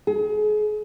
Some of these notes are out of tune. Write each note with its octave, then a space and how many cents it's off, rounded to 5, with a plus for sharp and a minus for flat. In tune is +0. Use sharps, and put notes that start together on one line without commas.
G#4 +35